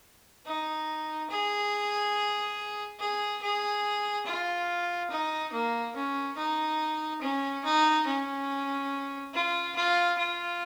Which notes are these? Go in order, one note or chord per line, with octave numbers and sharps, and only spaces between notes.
D#4
G#4
G#4
G#4
F4
D#4
A#3
C#4
D#4
C#4
D#4
C#4
F4
F4
F4